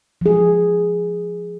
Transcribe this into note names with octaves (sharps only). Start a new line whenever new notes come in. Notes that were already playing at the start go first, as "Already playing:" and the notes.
F3 G#4